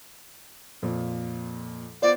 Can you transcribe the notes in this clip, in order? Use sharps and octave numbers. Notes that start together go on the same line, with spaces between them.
F2 A#2 F3
B3 F4 C5 D5